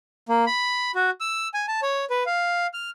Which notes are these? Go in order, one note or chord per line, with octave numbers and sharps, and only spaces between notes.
A#3
B5
F#4
E6
G#5
A5
C#5
B4
F5
F6